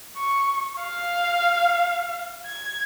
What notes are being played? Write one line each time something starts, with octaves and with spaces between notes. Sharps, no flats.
C#6
F5
G#6